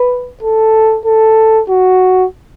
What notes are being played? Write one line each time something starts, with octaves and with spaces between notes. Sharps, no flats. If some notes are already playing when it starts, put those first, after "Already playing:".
Already playing: B4
A4
A4
F#4